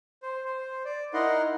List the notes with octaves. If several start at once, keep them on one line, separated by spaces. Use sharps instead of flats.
C5
C5
D5
D#4 E4 A#4 D#5 F#5 C6